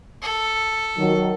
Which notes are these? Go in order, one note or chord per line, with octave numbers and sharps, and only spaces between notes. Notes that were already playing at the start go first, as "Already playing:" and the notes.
A4
D#3 F#3